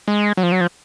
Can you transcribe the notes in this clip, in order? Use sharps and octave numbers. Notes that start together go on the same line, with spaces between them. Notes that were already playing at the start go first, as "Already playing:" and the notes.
G#3
F#3
F3
F#3
F3